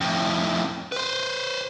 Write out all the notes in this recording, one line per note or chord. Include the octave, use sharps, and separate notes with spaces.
F2 A2
B4 C5